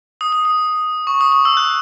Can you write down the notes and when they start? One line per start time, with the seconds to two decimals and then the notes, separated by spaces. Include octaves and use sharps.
0.21 D#6
0.32 D#6
0.45 D#6
1.07 C#6
1.21 D#6
1.32 D#6
1.45 E6
1.57 F#6